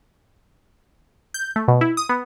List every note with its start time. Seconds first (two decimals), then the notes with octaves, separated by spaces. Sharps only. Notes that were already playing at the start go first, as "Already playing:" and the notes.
1.34 G6
1.56 A3
1.68 B2
1.81 E4
1.97 D#6
2.09 B3